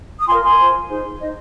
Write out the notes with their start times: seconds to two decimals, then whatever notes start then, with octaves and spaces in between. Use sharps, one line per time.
0.18 D#6
0.27 F4 A#4 G#5 C6
0.43 G#5 C6
0.58 F4 C5
0.89 D#4 G#4 C5
1.19 D#4 C5 D#5